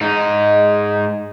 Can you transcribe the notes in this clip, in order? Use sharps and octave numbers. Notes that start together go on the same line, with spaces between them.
G#2 D#4